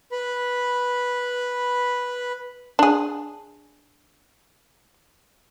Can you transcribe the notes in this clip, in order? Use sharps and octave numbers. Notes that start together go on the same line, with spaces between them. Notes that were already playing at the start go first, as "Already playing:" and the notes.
B4 B5
D4 G#4